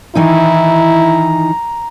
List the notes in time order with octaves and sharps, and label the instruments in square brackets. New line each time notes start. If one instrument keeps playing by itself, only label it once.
[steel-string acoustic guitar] D#3 E3 D#4 [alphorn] E4 [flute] A#5